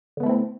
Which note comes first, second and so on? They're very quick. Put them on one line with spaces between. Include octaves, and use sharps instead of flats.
D3 B3 A3 E4 C4